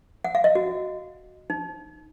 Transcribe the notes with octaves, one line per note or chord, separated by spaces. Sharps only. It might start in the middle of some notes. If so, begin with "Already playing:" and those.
F#5
F5
D#5
F#4
D#4